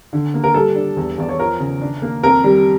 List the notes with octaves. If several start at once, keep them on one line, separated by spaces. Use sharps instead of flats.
D3
A#3
A#4
G3 A4
D4
E2
E2 D5
C#5
F3 A#4
C#3
D4
A#3
F2 A#4
G3